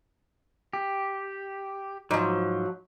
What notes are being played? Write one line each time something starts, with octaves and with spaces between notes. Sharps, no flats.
G4
G#2 F3 F#3